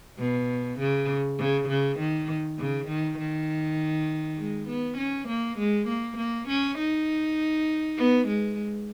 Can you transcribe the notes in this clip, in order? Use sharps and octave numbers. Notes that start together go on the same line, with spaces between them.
B2
C#3
C#3
C#3
D#3
C#3
D#3
D#3
G#3
B3
C#4
A#3
G#3
A#3
A#3
C#4
D#4
B3
G#3